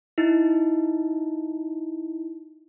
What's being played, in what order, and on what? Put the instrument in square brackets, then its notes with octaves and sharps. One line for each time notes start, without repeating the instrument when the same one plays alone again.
[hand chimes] D#4 E4